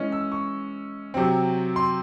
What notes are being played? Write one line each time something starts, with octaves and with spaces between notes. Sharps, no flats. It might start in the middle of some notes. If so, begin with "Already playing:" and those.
Already playing: E3 G#3 C#4
E6
C#6
C3 F#3 C4
C6